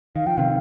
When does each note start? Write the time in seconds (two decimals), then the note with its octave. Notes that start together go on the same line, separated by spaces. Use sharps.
0.16 D#3 F5
0.27 F3 G5
0.37 C3 D#3 F5